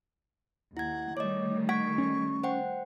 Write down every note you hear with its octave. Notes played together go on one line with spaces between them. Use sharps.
D#2 E4 F#5 G#6
D#3 G3 A3 C#5 D#5 D6
F#5 C#6 G#6 B6 D7
C#4
C5 F#5 G5